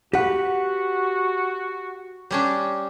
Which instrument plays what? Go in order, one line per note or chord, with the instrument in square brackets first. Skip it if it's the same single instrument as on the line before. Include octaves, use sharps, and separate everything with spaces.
[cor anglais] F#4 [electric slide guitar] G4 F#5 [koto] B4
[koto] G3 C#4 D4